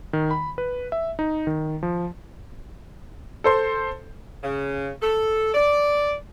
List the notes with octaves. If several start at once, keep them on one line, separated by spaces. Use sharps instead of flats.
D#3
B5
B4
E5
D#4
D#3
F3
A4 C5 C6
C#3
A4
D5